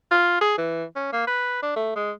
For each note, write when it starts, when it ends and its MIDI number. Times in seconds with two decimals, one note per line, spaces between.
0.11 0.40 65
0.41 0.53 68
0.58 0.84 52
0.96 1.11 61
1.12 1.24 58
1.27 1.61 71
1.63 1.76 62
1.76 1.92 57
1.96 2.11 56